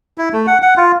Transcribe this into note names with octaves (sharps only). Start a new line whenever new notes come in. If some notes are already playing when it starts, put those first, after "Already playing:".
E4
A3
F#5
F#5
F4